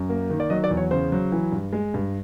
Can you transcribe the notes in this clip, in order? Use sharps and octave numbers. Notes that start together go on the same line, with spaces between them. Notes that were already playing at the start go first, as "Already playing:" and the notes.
Already playing: F#2
A#3
D#3
D5
F#3 D#5
D5
E2
C#5
C#3 C5
F#3
E3
G2
G#3
G2